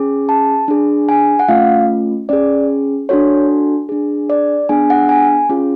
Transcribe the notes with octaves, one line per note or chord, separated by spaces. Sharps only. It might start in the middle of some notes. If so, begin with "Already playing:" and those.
Already playing: C#4 G#4
A5
D4 G#4
G#5
F#5
A3 C#4 F4 F5
C#4 G#4 D5
D4 F#4 A4 C#5
D4 G#4
D5
B3 D4 G#4 G#5
F#5
G#5
C#4 F4 G#4